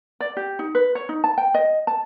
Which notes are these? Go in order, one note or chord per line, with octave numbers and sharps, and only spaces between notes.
D5
G4
D#4
B4
C#5
D#4
A5
G5
D#5
A5